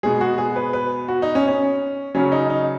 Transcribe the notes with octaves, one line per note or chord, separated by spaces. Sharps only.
B2 G#3 G#4
F#4
G#4
B4
B4
F#4
D#4
C#4
C#4
C#3 F#3 C#4
D#4
D#4